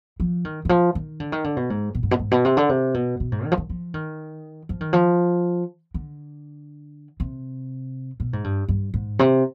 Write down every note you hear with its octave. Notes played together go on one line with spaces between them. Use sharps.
F3
D#3
D#3
F3
D#3
D3
D#3
D3
B2
G#2
B2
G#2
B2
G#2
B2
C3
D3
C3
B2
B2
G#2
D#3
F3
D#3
F3
D#3
F3
D#3
F3
D3
C3
B2
G#2
G2
G2
G#2
C3